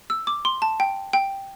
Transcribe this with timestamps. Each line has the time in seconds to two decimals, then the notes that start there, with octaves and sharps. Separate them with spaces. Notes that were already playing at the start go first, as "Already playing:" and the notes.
0.10 E6
0.27 D6
0.45 C6
0.62 A5
0.80 G5
1.13 G5